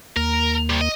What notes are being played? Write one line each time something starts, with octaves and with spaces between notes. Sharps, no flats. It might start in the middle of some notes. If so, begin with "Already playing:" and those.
D#2 A#3 A#4
C3 G3
D#5